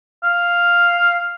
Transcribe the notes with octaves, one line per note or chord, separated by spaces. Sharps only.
F5